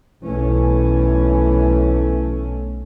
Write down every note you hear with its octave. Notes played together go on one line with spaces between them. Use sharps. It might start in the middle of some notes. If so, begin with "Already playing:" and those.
B1 E3 A3 C#4